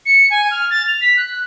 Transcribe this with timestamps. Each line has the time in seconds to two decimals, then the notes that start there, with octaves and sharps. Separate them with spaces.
0.06 C#7
0.30 G#5
0.51 F6
0.70 A6
0.87 F7
1.01 B6
1.17 F#6